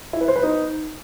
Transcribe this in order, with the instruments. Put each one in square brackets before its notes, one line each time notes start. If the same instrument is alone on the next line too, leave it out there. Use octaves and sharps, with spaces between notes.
[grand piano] E4
B4
C5
B4
D#4